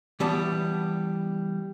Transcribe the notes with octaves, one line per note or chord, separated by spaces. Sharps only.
E3 G3 B3 A5